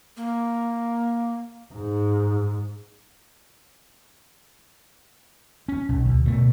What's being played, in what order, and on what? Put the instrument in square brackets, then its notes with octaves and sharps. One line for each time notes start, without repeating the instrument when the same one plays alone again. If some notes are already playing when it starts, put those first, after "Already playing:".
[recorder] A#3
[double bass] G#2
[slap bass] C#4
B1
D2
B2 A3